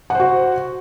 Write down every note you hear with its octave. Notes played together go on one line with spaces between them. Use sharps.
F#4 C5 F#5